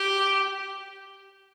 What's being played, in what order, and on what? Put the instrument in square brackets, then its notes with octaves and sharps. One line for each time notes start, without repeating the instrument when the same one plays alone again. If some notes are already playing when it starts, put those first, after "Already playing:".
Already playing: [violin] G4